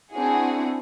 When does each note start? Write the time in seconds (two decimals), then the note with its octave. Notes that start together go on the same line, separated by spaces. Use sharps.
0.13 C4 D4 E4 F#4 G#4